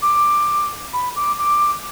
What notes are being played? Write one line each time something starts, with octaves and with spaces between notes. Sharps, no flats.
D6
B5
D6
D6